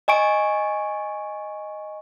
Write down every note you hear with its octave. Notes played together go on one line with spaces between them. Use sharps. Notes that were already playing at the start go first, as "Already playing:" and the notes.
D#5 G#5 C#6 D7